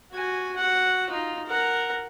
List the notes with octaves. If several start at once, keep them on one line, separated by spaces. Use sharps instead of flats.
F#4 G#5
F#4 F#5
D#4 F4
A#4 F#5